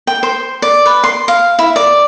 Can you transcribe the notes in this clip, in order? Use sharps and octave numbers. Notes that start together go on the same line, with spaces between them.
G5
C5
D5
B4
C6
F5
E4
D5